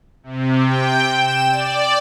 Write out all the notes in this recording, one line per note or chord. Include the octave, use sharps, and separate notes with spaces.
C3
G5
E7
D5